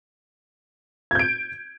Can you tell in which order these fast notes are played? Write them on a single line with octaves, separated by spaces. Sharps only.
G#6 G6 D7